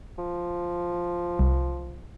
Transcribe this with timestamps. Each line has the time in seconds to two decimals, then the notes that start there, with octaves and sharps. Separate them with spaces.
0.18 F3
1.39 C2